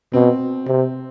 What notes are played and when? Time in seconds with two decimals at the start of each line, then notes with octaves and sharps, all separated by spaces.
0.13 B2 C4
0.67 C3